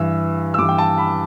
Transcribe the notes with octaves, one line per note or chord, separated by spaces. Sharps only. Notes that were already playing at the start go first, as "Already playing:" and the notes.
Already playing: G2 E3 E6
E6
G2 E3 D6
G5
A5
B5